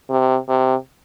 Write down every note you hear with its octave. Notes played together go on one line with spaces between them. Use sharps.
C3
C3